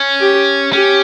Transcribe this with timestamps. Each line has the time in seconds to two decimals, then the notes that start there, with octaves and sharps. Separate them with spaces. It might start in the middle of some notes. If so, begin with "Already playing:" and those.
Already playing: C#4
0.20 G4
0.73 C#4 G4